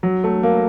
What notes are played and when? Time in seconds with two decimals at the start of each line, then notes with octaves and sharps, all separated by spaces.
0.03 F#3
0.24 A3
0.43 A#3